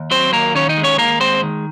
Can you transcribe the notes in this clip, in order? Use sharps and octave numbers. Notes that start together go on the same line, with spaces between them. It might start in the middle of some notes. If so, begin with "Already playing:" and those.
Already playing: D#2
F#3 C4 C5
D#2 A#3 A#4
D#3 C#4 C#5
D#4 D#5
G#3
C#4 C#5
D#2 A#3 A#4
G#3 C4 C5
D#3